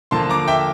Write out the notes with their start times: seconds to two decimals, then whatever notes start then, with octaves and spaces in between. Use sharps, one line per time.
0.11 D3 F3 A#3 A5 C6
0.29 A#5 D6
0.48 E5 G5